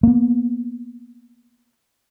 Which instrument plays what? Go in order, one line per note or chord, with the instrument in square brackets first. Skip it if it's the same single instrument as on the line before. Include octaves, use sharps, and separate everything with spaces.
[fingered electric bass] A#3 B3